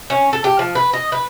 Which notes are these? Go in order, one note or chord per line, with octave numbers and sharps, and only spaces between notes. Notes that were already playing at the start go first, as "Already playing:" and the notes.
C#4
A4
G4
F3
B4
D#5
B4